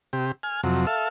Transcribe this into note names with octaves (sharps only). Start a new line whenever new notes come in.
C3 G4
G#5 F6
F2 C3 F#3
A4 E5 F5